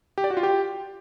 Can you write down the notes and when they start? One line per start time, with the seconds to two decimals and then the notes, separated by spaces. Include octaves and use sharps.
0.18 G4
0.24 D5
0.30 F#4
0.37 F4
0.43 G4